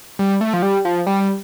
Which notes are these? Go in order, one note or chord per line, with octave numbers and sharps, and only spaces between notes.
G3
A3
F3
G3
F3
G3